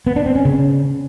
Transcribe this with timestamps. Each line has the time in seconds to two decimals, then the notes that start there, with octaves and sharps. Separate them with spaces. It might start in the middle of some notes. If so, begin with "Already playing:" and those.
0.06 B3
0.16 D4
0.26 C4
0.35 C#4
0.45 C#3